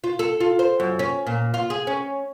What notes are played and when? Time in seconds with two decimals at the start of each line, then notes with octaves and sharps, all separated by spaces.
0.04 F4
0.19 A4
0.40 F4
0.59 C5
0.80 F#2
0.99 C#4
1.27 A#2
1.54 F4
1.70 G#4
1.87 C#4